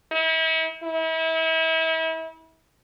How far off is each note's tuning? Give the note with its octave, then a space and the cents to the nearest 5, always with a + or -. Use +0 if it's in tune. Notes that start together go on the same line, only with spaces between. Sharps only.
E4 -40
E4 -35